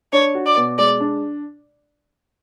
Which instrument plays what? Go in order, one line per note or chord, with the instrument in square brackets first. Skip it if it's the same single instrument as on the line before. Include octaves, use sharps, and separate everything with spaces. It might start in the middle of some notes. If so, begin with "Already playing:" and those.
[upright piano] D4 [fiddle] C#5
[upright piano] F#4
[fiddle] D5
[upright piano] B2
[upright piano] G#3 [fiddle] D5
[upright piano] D4